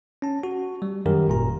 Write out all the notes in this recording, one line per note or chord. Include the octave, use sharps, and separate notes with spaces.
C#4 A5
F#4
G3
F#2 D#3 G4 A#4
G#1 A#2 A#5